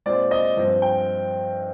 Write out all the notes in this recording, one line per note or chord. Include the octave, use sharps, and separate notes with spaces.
A#2 G#3 C4 D5
D#5
G2 F3 C4
G5